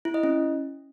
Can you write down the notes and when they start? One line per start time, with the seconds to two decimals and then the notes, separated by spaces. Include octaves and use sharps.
0.05 E4
0.14 D#5
0.23 C#4